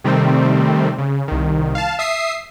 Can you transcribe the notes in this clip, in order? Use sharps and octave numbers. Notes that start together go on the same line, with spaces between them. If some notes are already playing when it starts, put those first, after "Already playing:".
C3 D#3 G3 A3 C4
C#3
C2 D#3
F5 A5
E5 D#6 C7